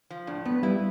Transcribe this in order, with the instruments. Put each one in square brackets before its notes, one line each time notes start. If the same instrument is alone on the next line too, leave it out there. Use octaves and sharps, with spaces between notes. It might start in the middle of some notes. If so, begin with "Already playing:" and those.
[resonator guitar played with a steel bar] F3
[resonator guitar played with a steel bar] A2 [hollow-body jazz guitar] D4
[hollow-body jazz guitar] B3 [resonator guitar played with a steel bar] B4
[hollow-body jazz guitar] G3 [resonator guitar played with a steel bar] E4